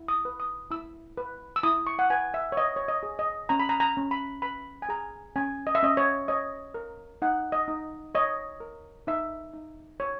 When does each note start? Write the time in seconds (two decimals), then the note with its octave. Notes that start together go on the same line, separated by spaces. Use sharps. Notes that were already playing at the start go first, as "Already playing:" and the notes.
Already playing: E4
0.08 D#6
0.25 B4
0.40 D#6
0.71 E4 E6
1.17 B4
1.56 E6
1.63 E4 D#6
1.87 C#6
1.99 F#5
2.10 B4 G#5
2.34 E5
2.52 C#5
2.57 B4 D#5
2.76 C#5
2.88 D#5
3.03 G#4
3.19 D#5
3.49 C#4 A#5
3.60 B5
3.69 A#5
3.80 A#5
3.97 C#4
4.11 B5
4.42 B4 B5
4.82 G#5
4.89 G#4 A#5
5.36 C#4 G#5
5.67 D#5
5.75 E5
5.83 C#4 D#5
5.97 C#5
6.28 C#5 D#5
6.74 A#4
7.22 D#4 F#5
7.52 D#5
7.68 D#4
8.15 C#5 D#5
8.60 A#4
9.07 D#4 E5
9.54 D#4
10.00 C#5